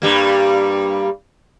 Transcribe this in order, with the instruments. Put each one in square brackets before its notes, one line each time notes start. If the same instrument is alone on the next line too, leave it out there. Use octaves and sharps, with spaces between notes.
[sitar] G2 G3 A#3